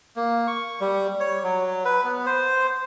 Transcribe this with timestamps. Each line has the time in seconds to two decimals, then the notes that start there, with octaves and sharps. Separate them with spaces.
0.16 A#3
0.47 C#6
0.81 G3
1.20 C#5
1.44 F#3
1.85 B4
2.04 B3
2.26 C5